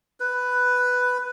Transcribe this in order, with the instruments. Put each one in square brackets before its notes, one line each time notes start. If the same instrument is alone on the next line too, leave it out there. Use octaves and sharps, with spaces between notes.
[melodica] B4